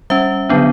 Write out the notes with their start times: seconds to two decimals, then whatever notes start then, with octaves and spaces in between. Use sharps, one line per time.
0.10 G3 C#4 E5
0.49 D3 F#3 B3 D4